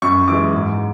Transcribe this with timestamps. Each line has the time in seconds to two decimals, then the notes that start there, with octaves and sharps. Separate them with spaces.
0.02 F#2 C#6
0.28 E3 G#3 D6
0.54 G#2